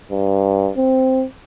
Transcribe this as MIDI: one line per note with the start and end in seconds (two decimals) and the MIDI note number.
0.11 0.69 43
0.77 1.24 60